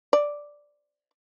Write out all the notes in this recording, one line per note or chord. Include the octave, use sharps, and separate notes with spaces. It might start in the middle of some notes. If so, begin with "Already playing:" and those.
D5